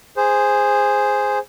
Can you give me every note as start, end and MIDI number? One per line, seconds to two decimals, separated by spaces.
0.17 1.39 68
0.17 1.39 72